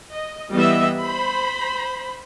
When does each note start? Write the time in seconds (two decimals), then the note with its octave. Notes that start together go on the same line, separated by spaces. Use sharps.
0.13 D#5
0.53 E3 G3 B3 D#5 E5
1.00 C5 B5